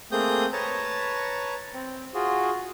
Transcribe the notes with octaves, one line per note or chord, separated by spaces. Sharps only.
A3 A#3 C4 G#4 D#6 G6
B4 C#5 A5 A#5
C4
F4 F#4 G#4